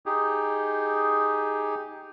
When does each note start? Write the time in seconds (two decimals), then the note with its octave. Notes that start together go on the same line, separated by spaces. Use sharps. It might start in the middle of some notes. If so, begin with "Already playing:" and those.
0.06 D#4 G4 G#4